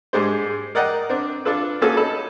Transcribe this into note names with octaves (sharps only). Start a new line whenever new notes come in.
G#2 G3 G#3 D4 C5
A#4 D5 D#5 F#5 G5 A#5
C4 D4
D4 F4 A4 B4
A#3 C#4 F4 F#4 G#4 A4
D#4 A4 B5